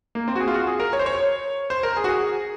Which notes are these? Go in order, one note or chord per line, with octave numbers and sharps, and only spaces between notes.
A#3
C4
F#4
G#4
F4
F#4
G#4
A#4
C#5
C5
C#5
C5
A#4
G#4
F#4
G#4